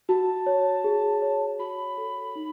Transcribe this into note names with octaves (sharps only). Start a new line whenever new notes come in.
F#4 A5
C#5
G#4
C#5
F#4 B5
A4
D#4